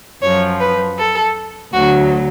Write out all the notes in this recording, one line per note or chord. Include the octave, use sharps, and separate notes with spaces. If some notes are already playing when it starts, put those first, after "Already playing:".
F#2 F3 C#5
B4
A4
D2 D3 F#3 F#4